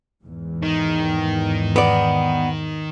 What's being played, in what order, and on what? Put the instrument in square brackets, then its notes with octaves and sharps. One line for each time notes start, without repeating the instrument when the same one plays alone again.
[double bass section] E2 G#2
[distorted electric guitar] D#3
[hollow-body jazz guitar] B3 D5